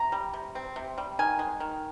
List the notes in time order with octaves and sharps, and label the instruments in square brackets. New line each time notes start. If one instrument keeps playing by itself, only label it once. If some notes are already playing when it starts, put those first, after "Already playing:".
Already playing: [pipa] C3 A#5
G3
C3
C4
C3
G3
D#3 G#5
G#3
D#3